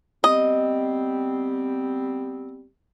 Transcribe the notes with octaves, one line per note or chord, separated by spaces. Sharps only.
G3 B3 C4 D#5